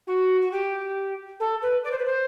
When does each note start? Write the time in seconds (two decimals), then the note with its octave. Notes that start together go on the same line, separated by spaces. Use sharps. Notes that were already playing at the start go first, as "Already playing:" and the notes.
0.07 F#4
0.41 F#4
0.51 G4
1.40 A4
1.62 B4
1.84 D5
1.91 C5
1.98 B4
2.05 C5